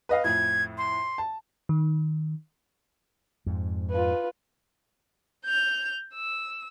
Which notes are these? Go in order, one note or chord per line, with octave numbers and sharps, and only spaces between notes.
B4 D#5 F5
F2 A2 G#6
C6
A5
D#3
F2 G#2
F4 B4
G6 F7
E6